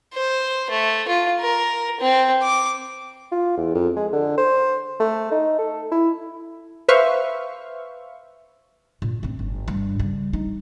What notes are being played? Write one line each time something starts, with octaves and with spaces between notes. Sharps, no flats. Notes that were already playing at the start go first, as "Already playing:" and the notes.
C5
A3
F4
A#4
C4
D6
F4
E2
F2
G#3
D3
C5
A3
D#4
A4
E4
B4 C5 E5 F5 C#6
A#2
F#2 C4
G1
G2
C#3 G3
D#4